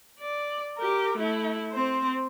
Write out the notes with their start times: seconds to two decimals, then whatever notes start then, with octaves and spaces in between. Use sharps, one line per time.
0.19 D5
0.78 G4 A#4
1.18 A3 E4
1.72 C4 C5